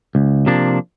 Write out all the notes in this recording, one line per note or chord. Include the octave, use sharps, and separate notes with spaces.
C#2
C3 F3 A#3 D4